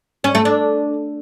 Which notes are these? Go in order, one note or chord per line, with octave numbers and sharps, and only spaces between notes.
C#4
A3
D4